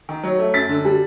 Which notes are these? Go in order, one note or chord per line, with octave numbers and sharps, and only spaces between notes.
D#3
F#3
A3
F#2 A6 B6
D3
G3